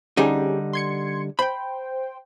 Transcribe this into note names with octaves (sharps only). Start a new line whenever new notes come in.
D3 G3 C#4 D#4 G4 G#4
C6 G#6 C#7
C5 G5 B5